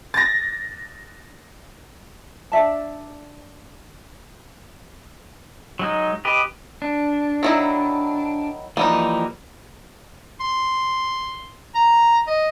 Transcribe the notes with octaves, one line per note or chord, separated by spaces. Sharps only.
A6 A#6
D4 D5 E5 A5
F#3 G#3 D#4
G4 B4 D#5
D4
D#3 F#3 E4
E3 F3 G3 A#3 D#4
C6
A#5
D#5